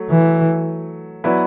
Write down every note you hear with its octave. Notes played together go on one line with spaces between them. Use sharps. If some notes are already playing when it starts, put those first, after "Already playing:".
Already playing: F#3 A3
E3
F#3 B3 E4 B4 D5